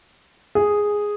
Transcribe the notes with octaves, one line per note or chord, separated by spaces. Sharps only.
G#4